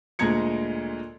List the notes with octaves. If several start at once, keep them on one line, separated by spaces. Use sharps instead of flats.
D2 A#2 G#3 A#5 G#6 C#7